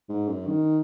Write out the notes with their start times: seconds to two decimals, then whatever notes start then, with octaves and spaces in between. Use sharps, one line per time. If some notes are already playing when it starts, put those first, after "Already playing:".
0.09 G#2
0.28 F#2
0.47 D#3